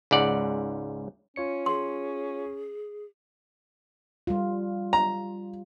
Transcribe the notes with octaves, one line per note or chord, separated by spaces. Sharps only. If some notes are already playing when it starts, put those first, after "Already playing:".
C#2 G#2 D5 F#5
C#4 F4 C#5 C#7
G#4 C6
G3 F4
A#5